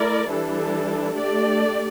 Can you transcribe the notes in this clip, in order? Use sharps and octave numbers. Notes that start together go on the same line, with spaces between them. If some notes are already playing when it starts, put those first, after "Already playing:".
Already playing: A3 E4 A#4 D5
E3 G3 D4 A4
A3 D4 G4 D5